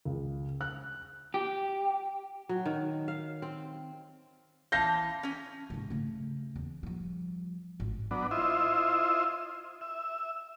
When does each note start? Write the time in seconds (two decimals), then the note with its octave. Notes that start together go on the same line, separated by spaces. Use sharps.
0.05 C#2
0.61 F#6
1.34 G4
2.49 F#3
2.66 D#3
3.08 F5
3.42 C4
4.72 E3 F5 A5 G6 A#6
5.23 C#4 G#5
5.70 G#2 C3
5.90 C#3 A3
6.56 E2
6.83 F3 G3
7.80 G#1
8.11 F#3 B3 D4
8.31 E4 F4 C5 D#5 E5
9.81 E5